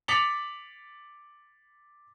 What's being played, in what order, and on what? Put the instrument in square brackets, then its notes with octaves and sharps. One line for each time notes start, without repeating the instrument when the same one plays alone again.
[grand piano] D6 A6 B6 C#7 F7 F#7